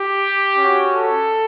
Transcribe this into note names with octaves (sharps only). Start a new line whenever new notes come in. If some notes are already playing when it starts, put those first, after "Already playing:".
Already playing: G4
C#4 F#4
A4